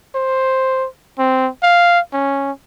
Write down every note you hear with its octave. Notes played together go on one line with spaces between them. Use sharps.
C5
C4
F5
C#4